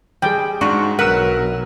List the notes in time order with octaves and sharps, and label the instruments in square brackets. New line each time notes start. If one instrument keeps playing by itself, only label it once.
[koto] G3 [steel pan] G#4 G5
[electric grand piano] G#2 D4 C#6 [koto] F4 F#4
[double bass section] B1 B2 F#3 [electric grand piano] A#4 [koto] B4 [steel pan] F#5 E6